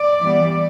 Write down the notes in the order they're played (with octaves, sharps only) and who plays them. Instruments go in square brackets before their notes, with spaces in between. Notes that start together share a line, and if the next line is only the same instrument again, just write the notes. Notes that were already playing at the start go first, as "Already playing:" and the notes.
Already playing: [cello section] D5
E3 G3 B3